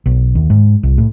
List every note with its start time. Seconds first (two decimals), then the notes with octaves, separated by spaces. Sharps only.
0.06 B1
0.35 D#2
0.50 G#2
0.83 C2
0.98 A2